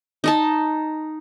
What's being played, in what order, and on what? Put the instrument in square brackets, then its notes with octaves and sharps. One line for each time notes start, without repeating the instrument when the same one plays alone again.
[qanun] D#4 D#5 A5